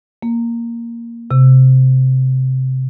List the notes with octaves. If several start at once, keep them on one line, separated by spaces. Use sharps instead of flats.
A#3
C3